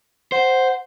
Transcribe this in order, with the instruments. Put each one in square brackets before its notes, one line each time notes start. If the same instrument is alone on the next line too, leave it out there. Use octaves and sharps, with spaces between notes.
[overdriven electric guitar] C5 [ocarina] F#5